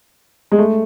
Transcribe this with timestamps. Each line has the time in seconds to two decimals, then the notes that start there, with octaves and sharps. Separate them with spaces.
0.52 G#3
0.58 A3